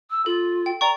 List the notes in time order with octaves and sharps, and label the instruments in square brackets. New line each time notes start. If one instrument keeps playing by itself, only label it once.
[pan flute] E6
[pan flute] F4 [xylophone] A4
[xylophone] G5
[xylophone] D5 G5 C#6 [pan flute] A#5